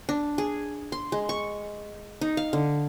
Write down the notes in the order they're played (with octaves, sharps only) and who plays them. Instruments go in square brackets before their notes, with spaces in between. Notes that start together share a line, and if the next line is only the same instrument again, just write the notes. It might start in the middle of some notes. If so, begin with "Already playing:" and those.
[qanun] D4
G#4
C6
G#3
C#6
D#4
F5
D3